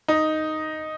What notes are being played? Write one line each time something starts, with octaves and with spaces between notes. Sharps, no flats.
D#4